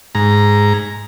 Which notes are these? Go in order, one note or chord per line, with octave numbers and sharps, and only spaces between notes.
G#2 A#5